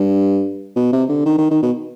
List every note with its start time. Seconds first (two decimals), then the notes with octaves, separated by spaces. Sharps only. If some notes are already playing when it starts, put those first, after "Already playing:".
Already playing: G2
0.76 B2
0.92 C3
1.09 D3
1.25 D#3
1.38 D#3
1.51 D#3
1.62 B2